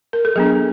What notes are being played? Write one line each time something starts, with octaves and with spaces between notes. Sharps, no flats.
A#4
A4
F#3 B3 D4 G#4